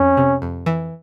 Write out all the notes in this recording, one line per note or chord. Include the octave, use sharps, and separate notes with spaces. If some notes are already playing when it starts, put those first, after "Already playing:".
Already playing: F2 C#4
C3
F2
E3